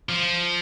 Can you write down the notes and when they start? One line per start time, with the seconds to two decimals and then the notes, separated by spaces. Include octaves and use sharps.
0.09 F3